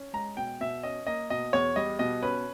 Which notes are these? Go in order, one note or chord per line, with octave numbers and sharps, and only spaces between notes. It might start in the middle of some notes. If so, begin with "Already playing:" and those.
Already playing: C#4
G#3 A#5
B2 G5
B2 E5
C#4 D#5
A#3 D#5
B2 D#5
E2 C#5
G3 D#5
B2 D#5
C#4 B4